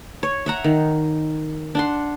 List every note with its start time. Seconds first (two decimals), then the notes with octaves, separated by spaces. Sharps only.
0.23 C#5
0.46 E5 F#5 A#5
0.64 D#3
1.75 D4 F#5 C6